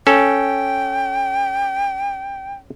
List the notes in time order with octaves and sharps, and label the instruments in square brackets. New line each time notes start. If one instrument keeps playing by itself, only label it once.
[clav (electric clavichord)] C#4 A4 [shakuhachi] G5